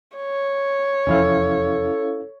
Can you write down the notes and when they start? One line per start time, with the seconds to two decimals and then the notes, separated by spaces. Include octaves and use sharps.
0.17 C#5
1.07 F1 E2 F3 C#4 E4 A4 F5